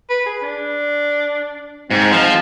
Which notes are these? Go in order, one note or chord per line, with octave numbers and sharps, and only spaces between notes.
B4
G#4
D4
G#2 C4
F3